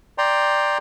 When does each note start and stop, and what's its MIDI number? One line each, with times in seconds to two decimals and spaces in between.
0.18 0.78 74
0.18 0.78 79
0.18 0.78 82
0.18 0.78 84